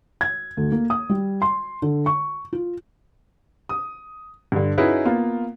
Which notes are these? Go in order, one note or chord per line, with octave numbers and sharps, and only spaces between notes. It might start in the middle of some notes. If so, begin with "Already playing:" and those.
G#6
D2
A#3
D#6
G3
C6
D3
C#6
F4
D#6
G2 D3
C#4 D#4 E4 F#4 G#4 B4
A#3 B3 F4